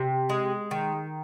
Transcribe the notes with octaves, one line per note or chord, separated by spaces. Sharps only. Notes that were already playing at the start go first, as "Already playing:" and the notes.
Already playing: C3
G#3
D#3